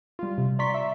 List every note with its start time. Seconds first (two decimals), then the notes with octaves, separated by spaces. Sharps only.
0.19 G3 F4
0.38 C3
0.59 D5 A#5 C6 C#6 B6
0.74 E5